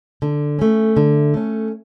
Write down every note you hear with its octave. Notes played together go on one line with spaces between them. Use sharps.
D3
A3 C#4
D3
A3 C#4